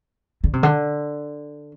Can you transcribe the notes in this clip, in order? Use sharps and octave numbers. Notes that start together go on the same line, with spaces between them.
D3
C3
D3